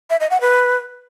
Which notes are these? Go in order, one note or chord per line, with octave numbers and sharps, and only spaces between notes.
E5
D#5
F#5
B4